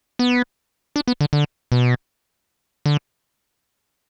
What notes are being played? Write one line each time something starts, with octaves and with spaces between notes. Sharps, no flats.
B3
D4
B3
D3
D3
B2
D3